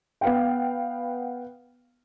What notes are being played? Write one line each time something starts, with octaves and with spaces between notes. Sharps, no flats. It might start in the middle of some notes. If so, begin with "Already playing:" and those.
B3 F5 G5